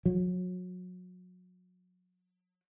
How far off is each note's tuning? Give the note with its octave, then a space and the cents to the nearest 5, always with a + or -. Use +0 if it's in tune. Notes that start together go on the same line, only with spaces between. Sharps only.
F#3 -30